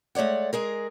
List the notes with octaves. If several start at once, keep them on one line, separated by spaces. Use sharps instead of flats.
G#3 A3 C#5 D5 F#5
G#3 G#4 A#4